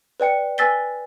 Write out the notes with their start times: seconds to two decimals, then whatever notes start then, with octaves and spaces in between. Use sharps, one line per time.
0.20 B4 D5 G5 C#7
0.58 B4 G#5 E6 A6 B6 G7